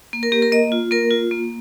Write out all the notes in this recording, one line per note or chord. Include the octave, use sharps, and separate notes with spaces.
A#3
A#4
A#3 G4
A#4
A#3 D#5
F4
A#3 A#4
F4
A#3